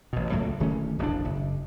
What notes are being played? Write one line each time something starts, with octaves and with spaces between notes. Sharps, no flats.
A1 B2
C#2 A2 F#3 A#3
D1 D#3 A3 C#4
E1 A#1 F2 D4
F#1